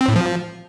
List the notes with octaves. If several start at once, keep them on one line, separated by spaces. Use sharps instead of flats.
C4
A2
F3